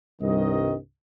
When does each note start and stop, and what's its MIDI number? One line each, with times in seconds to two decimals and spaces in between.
0.21 0.76 36
0.21 0.76 43
0.21 0.76 51
0.21 0.76 75